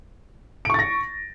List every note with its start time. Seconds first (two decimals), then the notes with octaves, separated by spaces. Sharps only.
0.65 D7
0.70 C#6
0.74 A6
0.79 A#6